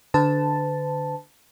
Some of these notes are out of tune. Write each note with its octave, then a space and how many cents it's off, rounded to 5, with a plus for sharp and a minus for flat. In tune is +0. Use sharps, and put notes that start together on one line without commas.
D3 +0 B4 +45 A5 +0